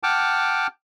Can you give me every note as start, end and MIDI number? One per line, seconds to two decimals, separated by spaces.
0.03 0.67 78
0.03 0.67 79
0.03 0.67 81
0.03 0.67 86
0.03 0.67 89